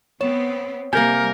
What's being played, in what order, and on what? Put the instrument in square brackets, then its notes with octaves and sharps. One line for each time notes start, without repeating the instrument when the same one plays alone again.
[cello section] B3 C4 [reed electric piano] C#5 [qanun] A5
[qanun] C3 A#3 [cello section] G3 [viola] A#4 [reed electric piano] G#5 G6